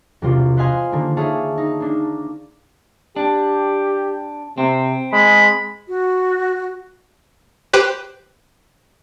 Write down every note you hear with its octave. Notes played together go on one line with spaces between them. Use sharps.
E1 C2 C3 G3 F4
B4 C5 D#5 F5 G#5 C6
D3 D#3 G3 A#3
D4 G#4 C#5 E5 F5 A5
D#4
A#3 D4
D4 G4
C3 C4
G#3 B5
F#4
G4 B4 C5 G5 D6 F#6